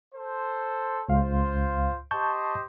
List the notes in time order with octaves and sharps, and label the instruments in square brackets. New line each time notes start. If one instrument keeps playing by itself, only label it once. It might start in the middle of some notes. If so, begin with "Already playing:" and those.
[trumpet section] A4 C5
[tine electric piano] C#2 F5 [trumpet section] F4 C5
[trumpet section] G4 C5 D#5 [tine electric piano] A5 C#6 G6